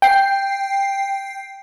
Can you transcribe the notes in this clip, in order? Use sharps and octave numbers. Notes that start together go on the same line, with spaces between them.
G5 C7